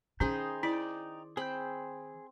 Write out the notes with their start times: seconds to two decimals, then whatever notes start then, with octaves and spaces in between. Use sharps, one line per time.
0.20 D#3 C#4 D#4 G#4 C5 G5 B5
0.63 E4 D5
1.37 C4 G#4 B5 G6